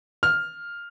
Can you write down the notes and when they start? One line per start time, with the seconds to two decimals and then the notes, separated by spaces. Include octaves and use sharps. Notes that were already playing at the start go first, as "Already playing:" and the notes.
0.23 F6